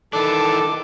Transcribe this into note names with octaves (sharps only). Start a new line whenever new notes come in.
D#3 E3 D4 A4 D6